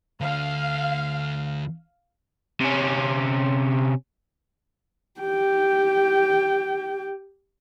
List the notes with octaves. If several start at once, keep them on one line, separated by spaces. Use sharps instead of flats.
D2 D3 F5
C3 C#4
G4 G5